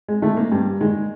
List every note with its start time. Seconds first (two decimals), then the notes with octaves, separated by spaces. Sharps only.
0.08 G#3
0.22 D#3 G#3 A3
0.37 A#3
0.52 G2
0.81 D#3 G#3